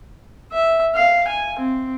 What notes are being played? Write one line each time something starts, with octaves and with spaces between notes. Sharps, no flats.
E5
F5
G#5
C4